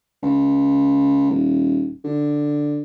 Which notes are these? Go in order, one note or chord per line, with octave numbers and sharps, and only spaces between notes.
C#2
D#1
D3